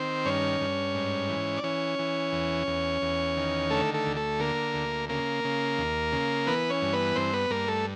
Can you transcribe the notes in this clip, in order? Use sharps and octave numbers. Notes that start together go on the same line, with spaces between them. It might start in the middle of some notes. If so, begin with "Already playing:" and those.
Already playing: D#3 C4 C5
G2 C#4 C#5
G2
G#2
E3
D5
E3 C#4 C#5
E3
E2
E2
E2
D#3
D3 A3 A4
A3 A4
D2
A3 A4
D3 A#3 A#4
D2
C#3 A#3 A#4
C#3
D#2
C#3
E3 B3 B4
C#4 C#5
G2
B3 B4
G2 C4 C5
B3 B4
G2 A#3 A#4
A3 A4